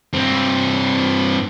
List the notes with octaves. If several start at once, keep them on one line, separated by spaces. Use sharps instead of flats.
G2 C4